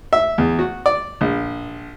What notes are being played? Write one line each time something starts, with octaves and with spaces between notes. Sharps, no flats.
E5
E2
F#4
D5
A#1